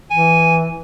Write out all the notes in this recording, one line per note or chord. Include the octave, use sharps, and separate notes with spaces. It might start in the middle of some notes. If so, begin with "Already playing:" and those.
E3 G#5